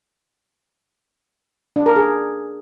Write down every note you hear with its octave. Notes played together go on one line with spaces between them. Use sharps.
D4
A#4
G#4